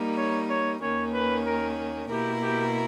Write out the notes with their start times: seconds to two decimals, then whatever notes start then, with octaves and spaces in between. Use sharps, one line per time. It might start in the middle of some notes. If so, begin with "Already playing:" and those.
Already playing: G3 A#3 D#4
0.17 C#5
0.50 C#5
0.81 D#2 D#3 A#3 C#4 C#5
1.13 B4
1.46 A#4
2.10 B2 A#3 E4 G4 A#4
2.42 G4